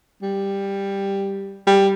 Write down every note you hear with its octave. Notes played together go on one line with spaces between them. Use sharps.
G3
G3